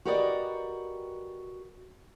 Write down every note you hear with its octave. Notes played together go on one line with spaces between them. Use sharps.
F#4 G4 A#4 B4 D5 D#5